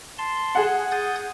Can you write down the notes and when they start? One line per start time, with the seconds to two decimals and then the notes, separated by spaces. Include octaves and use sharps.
0.18 A5 C6
0.55 G#4 F#5
0.91 D#6 G6 A6